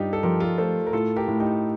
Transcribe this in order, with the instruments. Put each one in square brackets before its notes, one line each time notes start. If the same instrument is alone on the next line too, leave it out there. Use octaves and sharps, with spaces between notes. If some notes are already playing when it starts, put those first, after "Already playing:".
Already playing: [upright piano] G2 [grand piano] D4 D#4 F4 G4
[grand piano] A4
[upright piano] F3 [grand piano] G4 A#4
[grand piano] F4 A4
[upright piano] A3 [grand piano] A4 C5
[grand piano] A#4
[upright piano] A2 [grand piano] F4 A4
[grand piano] G4 A#4
[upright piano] A2
[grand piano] D#4 G4